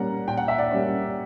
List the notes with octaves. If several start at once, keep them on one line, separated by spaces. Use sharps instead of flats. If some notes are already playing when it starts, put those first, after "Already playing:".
Already playing: A#2 G3 A#3 C#4 F#5 A#5
A#2 G5
F#5
E5
D5 F#5
G3 A#3 C#4